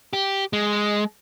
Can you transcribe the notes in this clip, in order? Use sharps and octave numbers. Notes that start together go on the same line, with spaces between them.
G4
G#3